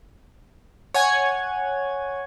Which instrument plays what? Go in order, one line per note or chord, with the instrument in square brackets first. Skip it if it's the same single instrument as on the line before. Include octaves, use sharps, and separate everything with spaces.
[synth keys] C#5 F#5 G#5 G#6